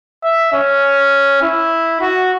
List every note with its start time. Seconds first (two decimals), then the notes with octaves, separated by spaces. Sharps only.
0.23 E5
0.53 C#4
1.42 E4
2.01 F#4